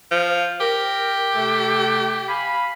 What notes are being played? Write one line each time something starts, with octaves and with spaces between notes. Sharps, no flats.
F3
G4 A#4
C3 A3 A4
F5 G#5 B5